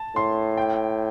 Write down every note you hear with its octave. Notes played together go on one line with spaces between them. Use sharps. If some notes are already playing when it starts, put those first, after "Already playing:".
Already playing: A5
A2 C6
G5